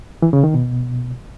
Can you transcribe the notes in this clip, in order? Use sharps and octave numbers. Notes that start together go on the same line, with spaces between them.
E3
C#3
D#3
B2